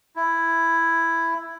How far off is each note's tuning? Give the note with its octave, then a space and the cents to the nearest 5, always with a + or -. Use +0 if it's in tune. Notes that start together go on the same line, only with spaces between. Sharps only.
E4 +5